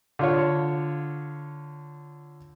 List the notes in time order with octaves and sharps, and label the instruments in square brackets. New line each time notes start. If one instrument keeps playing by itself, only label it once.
[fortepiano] D3 F4 C#5